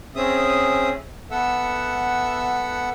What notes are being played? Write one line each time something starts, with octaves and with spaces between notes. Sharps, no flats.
C4 C#4 G#4 E5 D#6
B3 A4 E5 F#5 E6